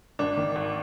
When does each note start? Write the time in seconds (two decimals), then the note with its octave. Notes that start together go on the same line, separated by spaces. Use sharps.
0.19 G#1 D4
0.37 D#3
0.56 G#1